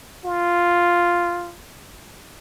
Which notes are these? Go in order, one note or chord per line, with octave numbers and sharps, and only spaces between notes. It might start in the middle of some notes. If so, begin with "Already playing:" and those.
F4